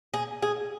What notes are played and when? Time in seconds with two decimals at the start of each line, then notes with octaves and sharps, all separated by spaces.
0.14 G#4
0.42 G#4